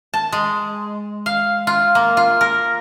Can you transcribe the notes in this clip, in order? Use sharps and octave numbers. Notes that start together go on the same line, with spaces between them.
A5
G#3
F5
F4
A#3
F4
A#4